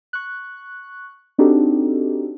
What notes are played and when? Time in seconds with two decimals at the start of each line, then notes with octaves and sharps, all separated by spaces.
0.13 C#6 F#6
1.38 C4 D4 D#4 F#4 G4 A4